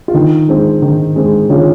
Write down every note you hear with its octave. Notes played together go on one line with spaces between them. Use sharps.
F4
D#3 D#4
G#3 C4
D#3
G#3 C4
D#3 C#4 F4